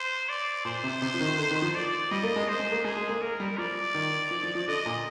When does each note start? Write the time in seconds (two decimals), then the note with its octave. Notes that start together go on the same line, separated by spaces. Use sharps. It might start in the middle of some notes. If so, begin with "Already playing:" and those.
Already playing: C5
0.29 D5
0.65 A#2 C5
0.83 C3
1.02 C3
1.14 F3
1.21 D#3
1.38 D3
1.51 D#3
1.62 F3
1.75 D5
2.11 G3 D#5
2.23 A#3
2.36 G#3
2.48 C5
2.60 G#3
2.72 A#3
2.85 G#3 G#4
2.96 G#3
3.09 A#3
3.21 A#3 A#4
3.40 G3
3.58 F3 D5
3.94 D#3
4.31 F3
4.43 F3
4.55 F3
4.68 D3 D#5
4.86 A#2